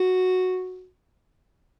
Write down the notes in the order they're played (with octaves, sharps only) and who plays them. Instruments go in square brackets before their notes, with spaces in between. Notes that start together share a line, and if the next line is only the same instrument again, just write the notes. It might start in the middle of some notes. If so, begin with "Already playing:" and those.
Already playing: [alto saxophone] F#4